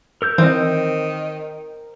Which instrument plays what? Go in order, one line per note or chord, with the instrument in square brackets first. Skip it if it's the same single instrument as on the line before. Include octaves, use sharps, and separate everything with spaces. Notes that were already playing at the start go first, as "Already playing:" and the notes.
[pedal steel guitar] A#4 E6 G6
[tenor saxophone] D#3 [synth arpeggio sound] E3 [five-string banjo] C4 D#5